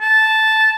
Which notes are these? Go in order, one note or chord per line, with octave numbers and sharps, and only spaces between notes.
A5